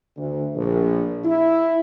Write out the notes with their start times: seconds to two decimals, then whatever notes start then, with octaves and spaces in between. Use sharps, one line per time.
0.17 D2
0.55 A#1
1.24 E4